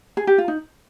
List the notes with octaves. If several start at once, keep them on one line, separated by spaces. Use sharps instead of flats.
G#4
G4
F4
D#4